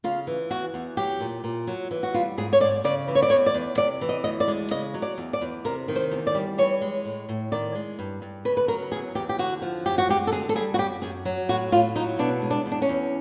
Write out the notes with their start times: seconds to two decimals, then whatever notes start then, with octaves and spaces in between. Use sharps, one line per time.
0.04 C#3 F4
0.27 E3
0.50 E2 F#4
0.74 E2
0.97 F#3 G4
1.20 A#2
1.44 A#2
1.67 F#3
1.91 E3
2.03 F#4
2.14 G3 F4
2.38 G#2 G#4
2.53 C#5
2.60 G#2 D5
2.84 C#3 D5
3.08 E3
3.15 C#5
3.22 D5
3.30 E2 C#5
3.46 D5
3.54 E2
3.78 C3 D5
4.01 E3
4.09 D#5
4.24 D2 D#5
4.40 D5
4.48 G#3
4.71 C#3 D#5
4.94 F#3
5.02 D5
5.18 E2
5.33 D5
5.41 E2
5.65 C3 A#4
5.88 D#3
5.96 C5
6.11 E2
6.27 D5
6.35 G3
6.58 E3 C#5
6.81 G#3
7.05 A2
7.29 A2
7.52 D#3 D5
7.75 G#3
7.99 G2
8.22 G2
8.45 C#3 B4
8.57 B4
8.68 F#3 A#4
8.91 E2 G#4
9.15 E2 G4
9.29 G4
9.39 D3 F#4
9.62 F3
9.86 F#2 G4
9.98 F#4
10.09 G#3 G4
10.27 A4
10.32 D3 G#4
10.49 A4
10.55 G3 G#4
10.74 F#4
10.79 F#2 G4
11.02 F#2 G#4
11.25 F#3
11.49 A2 F#4
11.72 A2 F4
11.96 F#3 D#4
12.19 B2 D4
12.42 G#3
12.50 D4
12.66 E2
12.72 D4
12.82 C#4
12.89 E2